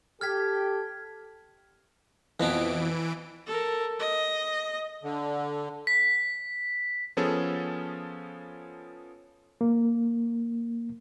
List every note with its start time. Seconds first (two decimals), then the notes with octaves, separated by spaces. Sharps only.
0.21 G4 A4 F6 G#6 B6
2.40 F2 B2 E3 B3 D7
3.46 A4 A#4
4.00 D#5
5.04 D3
5.87 B6
7.17 F3 B3 C#4 G#4 A4
9.61 A#3